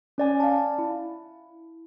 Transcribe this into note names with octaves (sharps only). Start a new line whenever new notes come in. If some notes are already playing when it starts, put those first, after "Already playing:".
C#4 D5 G#5
F5 A5
E4